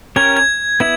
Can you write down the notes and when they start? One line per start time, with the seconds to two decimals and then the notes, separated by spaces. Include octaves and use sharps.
0.16 C#4 G4 A#4 C#5 G#6
0.37 G#6
0.80 B3 E4 G#6